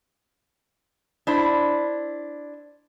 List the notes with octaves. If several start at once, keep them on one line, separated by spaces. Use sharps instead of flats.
D4 E4 C5